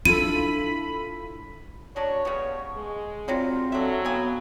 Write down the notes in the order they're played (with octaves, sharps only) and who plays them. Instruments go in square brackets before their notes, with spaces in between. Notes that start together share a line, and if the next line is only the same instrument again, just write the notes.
[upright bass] D4 [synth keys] E4 F4 A4 [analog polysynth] B5 [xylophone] D#7
[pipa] F#3 C#4 D4 [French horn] C#5 [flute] C#6
[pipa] C#3 G3 B3
[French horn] G#3
[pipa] C3 F#3 G3 [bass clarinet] C4 [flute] F4
[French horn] F#3 [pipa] D4 E5 [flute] A4
[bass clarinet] B3 [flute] F5 [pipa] G5 G#5